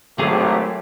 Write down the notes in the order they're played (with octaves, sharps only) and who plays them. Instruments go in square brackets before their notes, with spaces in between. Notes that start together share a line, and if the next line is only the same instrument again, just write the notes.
[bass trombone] G#1 [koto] F#3 G#4 F5 [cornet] A3 [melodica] G4